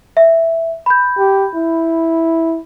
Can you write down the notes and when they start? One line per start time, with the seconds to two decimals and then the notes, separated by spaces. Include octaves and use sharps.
0.17 E5
0.86 B5 G6
1.18 G4
1.55 E4